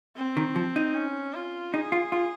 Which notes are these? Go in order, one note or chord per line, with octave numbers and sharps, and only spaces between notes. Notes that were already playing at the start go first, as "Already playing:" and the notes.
C4
D#3
F3
D#4
C#4
F4
D#4 G#4
F4
F4